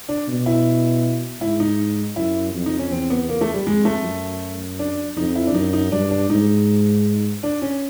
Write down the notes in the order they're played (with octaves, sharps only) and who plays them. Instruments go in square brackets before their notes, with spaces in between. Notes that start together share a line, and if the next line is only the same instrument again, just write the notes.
[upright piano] D4
[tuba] B2
[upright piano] E4
[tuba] G#2 [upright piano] E4
[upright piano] D#4
[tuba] F#2 [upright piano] E4
[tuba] F2
[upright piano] D#4
C#4
[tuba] E2 [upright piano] C4
[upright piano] B3
A#3
A3
G3
[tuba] F2 [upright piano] G#3
[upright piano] A3
[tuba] F#2
[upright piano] D4
[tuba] F2 [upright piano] D#4
[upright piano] E4
D4
[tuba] F#2 [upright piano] D#4
[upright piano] D#4
[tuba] G2 [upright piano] D4
[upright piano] D4
[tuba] G#2 [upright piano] D#4
[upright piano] D4
C#4